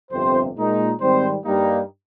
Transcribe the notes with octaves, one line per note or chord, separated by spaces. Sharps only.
G1 F2 C3 C4 C5
A#2 G#3 D#4
G#2 D#3 G3 C4 C5
G2 G3 A#3 D#4